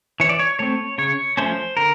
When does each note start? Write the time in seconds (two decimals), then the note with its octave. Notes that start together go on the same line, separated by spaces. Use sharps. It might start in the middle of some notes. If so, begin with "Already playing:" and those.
0.20 E3 C#5
0.29 D5
0.39 C#5
0.59 A3 C4 C#5
0.98 C#3 C#5
1.37 F3 A3 C#4 C5
1.77 D3 A#4